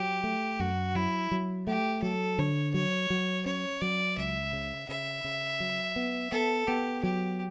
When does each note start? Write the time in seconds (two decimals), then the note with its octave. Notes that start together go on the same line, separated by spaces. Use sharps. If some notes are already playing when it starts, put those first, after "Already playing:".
Already playing: F#3 G4
0.24 A3
0.60 F#2 F#4
0.95 F#3 E4
1.31 F#3
1.67 A3 G4
2.02 F#3 A4
2.38 D3 C#5
2.74 F#3 C#5
3.10 F#3
3.46 C#4 C#5
3.82 F#3 D5
4.17 C#2 E5
4.53 C#3
4.89 C#3 E5
5.24 C#3
5.60 F#3
5.96 B3
6.31 B3 A4
6.68 B3 G4
7.03 F#3 G4